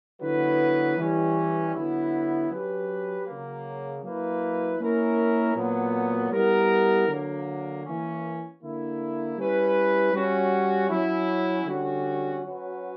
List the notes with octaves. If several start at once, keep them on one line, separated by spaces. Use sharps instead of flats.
D3 F#3 B3 E4 B4
E3 G3 C#4
D3 F#3 B3 E4
F#3 C#4 G4 B4
C#3 F#3 A#3
F#3 A#3 E4 B4
A#3 C#4 E4 A#4
A#2 F#3 B3
G3 B3 E4 A#4
D3 F#3 A#3
E3 A#3 C#4
D3 A#3 E4
G3 C#4 E4 B4
G3 C#4 F#4
F#3 C#4 E4
D3 G3 C#4 F#4
F#3 C#4 F#4 B4